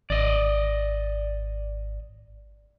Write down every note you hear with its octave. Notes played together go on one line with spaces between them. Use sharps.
G#1 D5 D#5